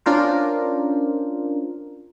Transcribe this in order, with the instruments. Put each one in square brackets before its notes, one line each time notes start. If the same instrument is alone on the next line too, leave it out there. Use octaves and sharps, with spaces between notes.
[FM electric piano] C#4 D4 F4 A#4 C5